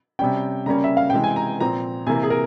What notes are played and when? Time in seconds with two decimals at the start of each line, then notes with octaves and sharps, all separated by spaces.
0.19 C3 G3 C#4 G5
0.66 C#3 G3 A#3 C#4 A#5
0.84 E5
0.97 F5
1.10 C3 E3 G#3 G5
1.24 G#5
1.36 A#5
1.60 A#2 F3 C4 A#5
2.07 C3 E3 A#3 G#5
2.23 G#4
2.30 A#4